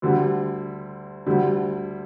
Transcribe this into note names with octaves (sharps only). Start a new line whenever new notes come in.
D2 D3 G3
D2 D3 G3